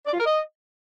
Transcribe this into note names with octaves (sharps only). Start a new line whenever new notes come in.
D5
F4
A#4
D#5